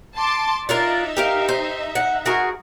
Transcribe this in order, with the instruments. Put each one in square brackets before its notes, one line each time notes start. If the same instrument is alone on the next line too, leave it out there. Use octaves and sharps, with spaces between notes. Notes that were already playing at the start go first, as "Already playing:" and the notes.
[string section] A5 C6 D6
[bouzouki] D4 F4 A#4 [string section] D#4 E5
[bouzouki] G4 A#4 F5
C5
F#5
F#4 G#4 A#4